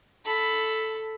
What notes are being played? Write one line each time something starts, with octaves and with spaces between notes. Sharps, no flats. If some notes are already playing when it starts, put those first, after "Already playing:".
A4 B5